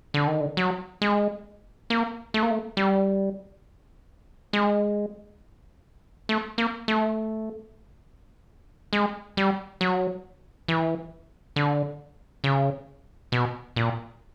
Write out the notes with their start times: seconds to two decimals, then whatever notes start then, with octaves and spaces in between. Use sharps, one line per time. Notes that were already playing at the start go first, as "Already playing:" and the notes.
0.14 D3
0.27 D#3
0.41 D3
0.57 F#3
1.02 G#3
1.90 A#3
2.34 A3
2.43 A#3
2.51 A3
2.77 G3
4.53 G#3
6.29 A3
6.58 A#3
6.88 A3
8.93 G#3
9.37 G3
9.81 F#3
10.68 E3
11.56 D3
12.44 C#3
13.32 B2
13.76 A#2